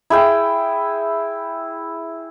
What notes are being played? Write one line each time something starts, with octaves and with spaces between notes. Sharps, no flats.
E4 G#4 G5